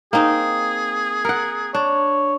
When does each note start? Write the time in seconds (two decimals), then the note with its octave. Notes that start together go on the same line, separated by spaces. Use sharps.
0.13 A#3 C4 D#4 G#4
1.25 A#4 F#5
1.74 D4 C#5